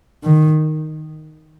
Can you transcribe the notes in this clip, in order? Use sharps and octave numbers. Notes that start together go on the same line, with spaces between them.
D#3